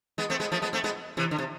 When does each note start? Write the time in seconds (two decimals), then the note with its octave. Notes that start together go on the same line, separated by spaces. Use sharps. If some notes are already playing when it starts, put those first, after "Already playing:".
0.18 G#3 B3
0.30 A3 C4
0.40 G#3 B3
0.52 F3 A3
0.62 G#3 B3
0.73 A3 C4
0.84 G#3 B3
1.17 C3 E3
1.31 D3
1.38 C3